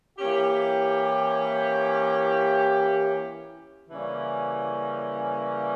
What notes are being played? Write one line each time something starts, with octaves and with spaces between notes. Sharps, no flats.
E3 A#3 C#4 G4
C#3 E3 G3 A#3 C#4